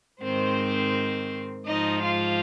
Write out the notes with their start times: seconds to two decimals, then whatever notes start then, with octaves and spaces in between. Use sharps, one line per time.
0.23 G#2 D#3 C4 C5
1.67 G#2 F3 D#4 D#5
2.03 F4 F5